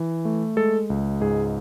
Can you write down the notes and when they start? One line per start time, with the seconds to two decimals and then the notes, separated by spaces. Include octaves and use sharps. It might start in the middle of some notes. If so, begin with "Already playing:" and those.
Already playing: E3
0.25 A3
0.56 G#3 A4
0.90 C#2
1.21 G#2 G#4